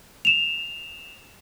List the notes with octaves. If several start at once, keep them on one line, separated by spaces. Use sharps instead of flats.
E7 F7